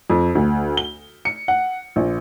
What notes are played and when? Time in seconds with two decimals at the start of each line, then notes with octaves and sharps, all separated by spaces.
0.10 F2
0.35 D2
0.77 G7
1.25 C#7
1.48 F#5
1.96 A#1